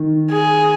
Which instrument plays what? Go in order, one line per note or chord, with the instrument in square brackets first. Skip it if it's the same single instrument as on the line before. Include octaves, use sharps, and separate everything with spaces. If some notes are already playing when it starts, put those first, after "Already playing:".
Already playing: [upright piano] D#3
[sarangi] G#4